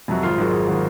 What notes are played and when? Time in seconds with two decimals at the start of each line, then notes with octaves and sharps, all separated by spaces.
0.08 F2 C3 F#3
0.23 G#1 F4
0.38 G#2 D#3 F#3
0.53 G#1
0.68 D#3 F#3